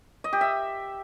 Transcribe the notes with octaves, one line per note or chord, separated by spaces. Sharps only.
D#5
G4
E5